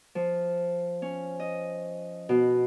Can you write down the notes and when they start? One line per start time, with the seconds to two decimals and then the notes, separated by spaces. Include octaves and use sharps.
0.15 F3
1.02 C#4
1.40 D#5
2.29 B2